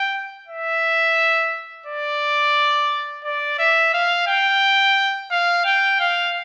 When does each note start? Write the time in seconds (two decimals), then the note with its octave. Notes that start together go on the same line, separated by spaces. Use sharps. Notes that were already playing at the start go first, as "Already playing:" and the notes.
Already playing: G5
0.48 E5
1.86 D5
3.24 D5
3.59 E5
3.94 F5
4.27 G5
5.31 F5
5.65 G5
6.00 F5